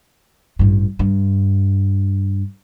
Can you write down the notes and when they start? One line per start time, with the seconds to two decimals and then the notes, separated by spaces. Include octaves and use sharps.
0.59 A1 G2
0.99 G2